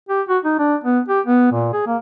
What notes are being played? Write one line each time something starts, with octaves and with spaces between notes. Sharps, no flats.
G4
F#4
D#4
D4
B3
G4
B3
A#2
G#4
A#3